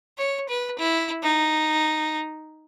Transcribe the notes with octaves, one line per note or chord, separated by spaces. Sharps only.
C#5
B4
E4
D#4